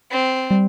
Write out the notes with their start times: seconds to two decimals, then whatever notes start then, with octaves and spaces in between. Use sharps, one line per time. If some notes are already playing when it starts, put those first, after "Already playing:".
0.11 C4
0.51 G3